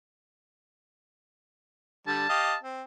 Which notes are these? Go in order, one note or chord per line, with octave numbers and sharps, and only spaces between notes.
D3 G3 A5
G4 D#5 F5
C4